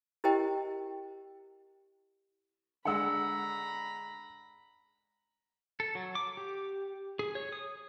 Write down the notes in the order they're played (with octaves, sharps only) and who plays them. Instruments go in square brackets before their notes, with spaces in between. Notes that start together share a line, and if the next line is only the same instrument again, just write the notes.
[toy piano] E4 G4 A#4 C5 D#5 G5
[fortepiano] D3 G#3 D4 [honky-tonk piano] F#5 E6 [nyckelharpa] A#5 B5
[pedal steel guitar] A4
F#3
D6
G4
G#4
C#5
D#6